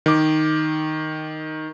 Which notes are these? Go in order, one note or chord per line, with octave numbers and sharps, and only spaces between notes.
D#3 D6